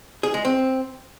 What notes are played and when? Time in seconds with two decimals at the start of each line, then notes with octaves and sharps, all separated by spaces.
0.23 G#4
0.34 G#3
0.45 C4